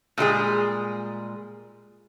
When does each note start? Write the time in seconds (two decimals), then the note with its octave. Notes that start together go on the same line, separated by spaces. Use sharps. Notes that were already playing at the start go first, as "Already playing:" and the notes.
0.18 A#2 G3 G#3 G#4